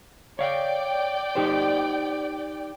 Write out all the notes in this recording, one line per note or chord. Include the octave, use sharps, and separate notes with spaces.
C#5 D5 F5 G5
D#4 G4 C5